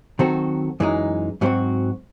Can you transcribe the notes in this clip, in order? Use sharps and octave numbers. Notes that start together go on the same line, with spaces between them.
D#3 F#3 C4 F#4 A4
F#2 E3 G#3 D#4
G#2 F#3 C4 F#4